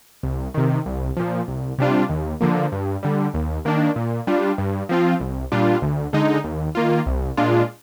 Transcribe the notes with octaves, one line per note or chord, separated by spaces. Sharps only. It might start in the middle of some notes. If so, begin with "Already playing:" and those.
C2
C3 D#3
C2
A#2 F3
C2
C3 G3 D4 F4
D#2
D3 F3 A#3
G2
D3 G3
D#2
D#3 A#3 D4
A#2
G3 D4 F4
G2
F3 C4 F4
C2
A#2 G3 D4 F4
D2
D3 G#3 D#4
D#2
D#3 A#3 F4
C2
A#2 G#3 D4 F4